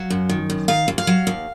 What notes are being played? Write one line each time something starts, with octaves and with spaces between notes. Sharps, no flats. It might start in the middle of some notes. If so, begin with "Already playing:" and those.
Already playing: F#3 F5
F#2
D#3
F#2
D#3 F5
D#2
F5
F#3
D#2